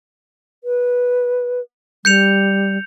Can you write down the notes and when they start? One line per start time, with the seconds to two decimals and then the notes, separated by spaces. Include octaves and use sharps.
0.64 B4
2.05 G3 G6 C#7 F7